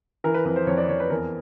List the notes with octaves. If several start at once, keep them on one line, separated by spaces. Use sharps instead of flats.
E3 A#4
B4
F2 B4
C5
F2 C#5
D5
F2 C#5
B4
E2 A#4